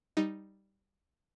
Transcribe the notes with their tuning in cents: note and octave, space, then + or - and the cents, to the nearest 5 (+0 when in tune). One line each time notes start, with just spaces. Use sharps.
G3 +0 D#4 +0